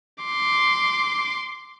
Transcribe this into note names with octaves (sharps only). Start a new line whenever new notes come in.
C6 D6